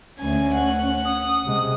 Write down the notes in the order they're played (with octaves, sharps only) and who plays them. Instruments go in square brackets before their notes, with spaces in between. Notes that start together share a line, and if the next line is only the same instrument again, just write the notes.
[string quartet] D2 G#5 [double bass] C#4
[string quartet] F#5
[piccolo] D#6
[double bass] C3 G#3